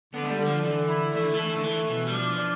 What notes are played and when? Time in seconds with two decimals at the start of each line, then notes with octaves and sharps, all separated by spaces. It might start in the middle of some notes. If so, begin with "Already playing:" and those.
0.14 D3 B3
0.24 A3
0.30 G3
0.38 D3
0.47 F3
0.63 D3 E3
0.88 E4
1.14 E3 A3
1.24 D3
1.34 E3 A3
1.56 D3
1.63 E3 A3
1.88 B2 E3
2.07 G3
2.13 F3 D4
2.39 D4